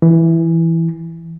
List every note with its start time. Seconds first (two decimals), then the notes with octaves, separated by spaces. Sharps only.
0.02 E3